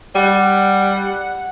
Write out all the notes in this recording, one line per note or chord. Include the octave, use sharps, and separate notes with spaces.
G3 F#5